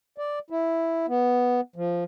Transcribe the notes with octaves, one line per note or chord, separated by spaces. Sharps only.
D5
E4
B3
F3